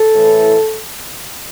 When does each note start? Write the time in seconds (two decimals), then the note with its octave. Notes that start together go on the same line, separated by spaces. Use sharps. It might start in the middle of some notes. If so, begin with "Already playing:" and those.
Already playing: A4
0.15 A2 E3